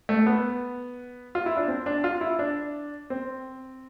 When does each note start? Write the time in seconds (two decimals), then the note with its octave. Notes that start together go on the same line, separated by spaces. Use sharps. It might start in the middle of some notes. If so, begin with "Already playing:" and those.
0.09 A3
0.26 B3
1.35 F4
1.46 E4
1.57 D4
1.68 C4
1.86 D4
2.04 F4
2.21 E4
2.39 D4
3.10 C4